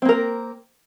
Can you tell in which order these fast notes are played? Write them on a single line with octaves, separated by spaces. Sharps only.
C4 A#3 A#4